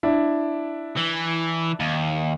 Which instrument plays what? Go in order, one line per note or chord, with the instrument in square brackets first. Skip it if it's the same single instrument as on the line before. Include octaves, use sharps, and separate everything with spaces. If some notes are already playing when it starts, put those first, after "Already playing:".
[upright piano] D4 E4
[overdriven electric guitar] E3
D#2